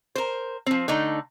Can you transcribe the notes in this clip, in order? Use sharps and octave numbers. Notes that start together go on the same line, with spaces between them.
A#4 C5
F3 C4
D3 A3 D#4